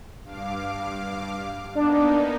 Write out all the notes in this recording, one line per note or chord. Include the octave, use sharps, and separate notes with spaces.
G2 F5 D6
A#3 B3 D4 D#4